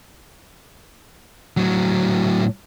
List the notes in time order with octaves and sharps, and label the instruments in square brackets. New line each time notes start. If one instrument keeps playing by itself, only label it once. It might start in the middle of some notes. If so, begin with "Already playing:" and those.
[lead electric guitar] A2 F#3